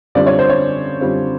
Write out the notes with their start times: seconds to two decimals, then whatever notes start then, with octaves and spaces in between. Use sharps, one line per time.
0.15 F#2 D3 G3 C4 F4 D5
0.26 C#5
0.39 C5
0.49 C#5
1.01 F#2 D3 G3 C4 F4